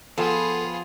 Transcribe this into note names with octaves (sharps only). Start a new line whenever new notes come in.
F3 B3 F4 G#4 A4 F5 G5